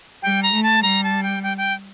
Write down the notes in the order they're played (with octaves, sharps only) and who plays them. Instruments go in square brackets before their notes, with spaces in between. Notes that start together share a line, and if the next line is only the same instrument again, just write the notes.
[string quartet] G3 [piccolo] G5
[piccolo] A#5
[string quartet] A3
[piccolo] A5
[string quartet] G3 [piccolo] A#5
[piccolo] A5
G5
G5
G5